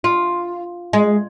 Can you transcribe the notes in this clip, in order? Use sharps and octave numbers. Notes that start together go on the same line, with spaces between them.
F4
G#3